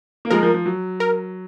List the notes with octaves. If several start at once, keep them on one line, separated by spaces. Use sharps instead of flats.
A#3
F3 G#3 A#4
F3
F3
F#3
A#4